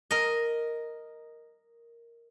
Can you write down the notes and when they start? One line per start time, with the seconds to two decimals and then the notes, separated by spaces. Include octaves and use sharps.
0.11 A#4 D#5